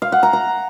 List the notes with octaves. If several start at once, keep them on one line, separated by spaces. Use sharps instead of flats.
F5
F#5
A#5
A#5